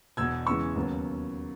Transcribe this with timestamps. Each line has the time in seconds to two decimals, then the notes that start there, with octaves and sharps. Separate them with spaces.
0.17 E1 E2 B2 E6 G#6
0.47 E2 C#3 E3 G#3 C#6 E6
0.76 D#2 C#3 F#3 B3